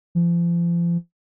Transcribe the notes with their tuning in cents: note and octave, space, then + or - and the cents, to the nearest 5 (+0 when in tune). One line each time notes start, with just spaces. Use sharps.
F3 -35